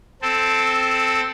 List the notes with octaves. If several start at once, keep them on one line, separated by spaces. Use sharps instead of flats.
C4 A4